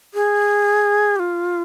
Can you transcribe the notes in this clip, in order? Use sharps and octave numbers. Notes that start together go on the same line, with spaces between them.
G#4
G4
F4